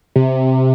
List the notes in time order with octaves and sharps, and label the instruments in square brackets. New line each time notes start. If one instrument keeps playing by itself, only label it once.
[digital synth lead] C3